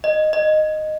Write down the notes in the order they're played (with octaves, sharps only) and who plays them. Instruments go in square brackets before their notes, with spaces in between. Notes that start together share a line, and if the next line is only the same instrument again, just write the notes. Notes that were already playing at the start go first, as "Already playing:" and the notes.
[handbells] D#5
D#5